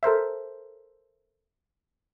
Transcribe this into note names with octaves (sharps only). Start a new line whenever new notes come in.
A4 A#4 C5 E5